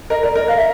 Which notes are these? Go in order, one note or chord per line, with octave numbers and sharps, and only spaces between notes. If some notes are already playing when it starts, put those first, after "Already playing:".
A#4 D#5
A#4 D5
A#4 D#5
A#4 F5
E5